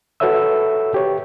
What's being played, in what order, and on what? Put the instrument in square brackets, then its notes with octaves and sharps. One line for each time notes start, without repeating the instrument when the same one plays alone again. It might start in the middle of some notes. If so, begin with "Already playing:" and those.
[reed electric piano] F#4 A4 B4 C#5 E5 E6
G4 C#5